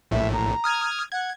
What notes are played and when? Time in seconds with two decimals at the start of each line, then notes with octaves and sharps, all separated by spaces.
0.11 A#1 A2 E5
0.33 A#5
0.64 D#6 F6 G#6
1.12 F#5 G#6